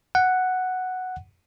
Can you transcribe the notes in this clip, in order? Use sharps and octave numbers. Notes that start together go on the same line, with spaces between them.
F#5